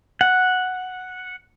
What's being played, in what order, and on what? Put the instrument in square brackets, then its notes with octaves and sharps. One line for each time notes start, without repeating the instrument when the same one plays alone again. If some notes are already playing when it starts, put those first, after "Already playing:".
[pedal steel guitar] F#5